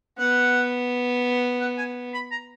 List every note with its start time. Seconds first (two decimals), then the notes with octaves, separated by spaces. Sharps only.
0.19 B3 F#5
1.61 F#5
1.78 G#5
2.14 B5
2.31 A#5